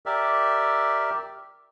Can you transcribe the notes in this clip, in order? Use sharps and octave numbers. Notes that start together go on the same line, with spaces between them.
G4 A#4 D5 E5